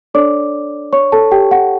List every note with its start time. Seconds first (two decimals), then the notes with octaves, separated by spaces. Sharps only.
0.14 D4 A4 C#5 D5 D6
0.93 C#5 C#6
1.12 A4 A5
1.32 G4 G5
1.51 F#5